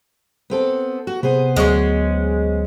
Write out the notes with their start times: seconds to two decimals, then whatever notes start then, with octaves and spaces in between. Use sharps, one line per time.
0.50 B3 C4 A4
1.07 F#4
1.23 C3 B3 G#4 C5
1.56 D2 F#3 G#3 C#4 C#6